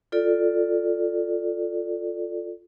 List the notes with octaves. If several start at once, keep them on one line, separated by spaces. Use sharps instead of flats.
F4 A4 D5